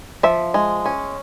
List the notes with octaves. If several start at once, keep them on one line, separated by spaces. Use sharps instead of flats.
F3 E5
G#3
C#4